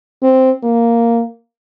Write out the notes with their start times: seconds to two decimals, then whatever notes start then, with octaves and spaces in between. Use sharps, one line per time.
0.22 C4
0.64 A#3